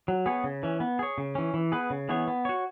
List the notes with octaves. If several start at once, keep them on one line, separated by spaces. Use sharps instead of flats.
F#3
B3 G#4 C#5
C#3
E3 C#4
B3
G#4 C#5
C#3
E3 C#4
E3
B3 G#4 B4
C#3
E3 B3 G#4 C#5
B3
F#4 C#5